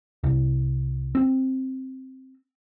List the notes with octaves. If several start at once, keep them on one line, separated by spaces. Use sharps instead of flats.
C2
C4